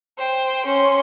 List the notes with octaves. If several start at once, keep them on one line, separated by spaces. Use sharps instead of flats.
C5 G5
C#4 C6